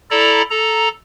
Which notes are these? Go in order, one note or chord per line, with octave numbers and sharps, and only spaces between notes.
E4 A4 D5 A#5
A4 A#5